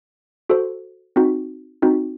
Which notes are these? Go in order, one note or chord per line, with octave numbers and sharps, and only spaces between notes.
F#4 A4 C5
C4 D#4 F#4
C4 D#4 F#4